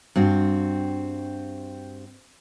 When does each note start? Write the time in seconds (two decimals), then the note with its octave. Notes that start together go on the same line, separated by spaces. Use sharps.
0.16 G2 C4 F#4